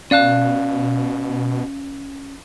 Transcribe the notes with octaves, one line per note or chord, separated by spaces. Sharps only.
B2 C#4 D5 F5 A5 F#6